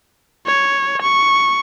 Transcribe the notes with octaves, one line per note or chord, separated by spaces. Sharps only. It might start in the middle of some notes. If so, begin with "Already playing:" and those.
C#5
C#6